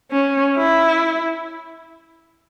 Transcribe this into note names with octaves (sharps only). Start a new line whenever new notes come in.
C#4
E4